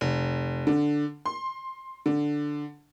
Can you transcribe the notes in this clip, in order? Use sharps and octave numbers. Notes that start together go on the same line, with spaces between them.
F1
D3
C6
D3